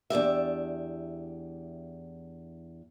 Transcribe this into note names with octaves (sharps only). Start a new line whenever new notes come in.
E2 D4 G4 E5